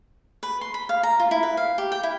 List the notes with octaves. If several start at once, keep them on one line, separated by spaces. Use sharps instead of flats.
B4
C6
B5
F5
A#5
F4
E4
B4
F5
G4
G5
E4